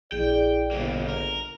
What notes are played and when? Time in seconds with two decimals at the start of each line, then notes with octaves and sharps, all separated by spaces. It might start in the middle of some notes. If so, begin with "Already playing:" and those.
0.12 A#1 E4 G#4 D5 G5
0.71 G1 C#2 B2 A#3
1.08 A#4